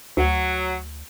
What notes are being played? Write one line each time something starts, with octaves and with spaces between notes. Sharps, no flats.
D2 F#3